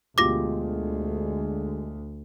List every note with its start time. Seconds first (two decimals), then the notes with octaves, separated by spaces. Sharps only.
0.18 D2 B2 D3 G#3 F4 G4 D6 A#6